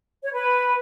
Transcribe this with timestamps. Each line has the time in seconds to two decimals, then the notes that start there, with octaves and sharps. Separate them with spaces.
0.24 C#5
0.32 B4